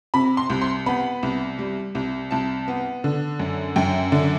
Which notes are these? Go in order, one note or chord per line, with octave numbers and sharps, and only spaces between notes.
C3 B5
C6
C2
C6
B3 B5
C2
G3
C2
C2 A5
B3
D3
F#2
F#2 G5
D3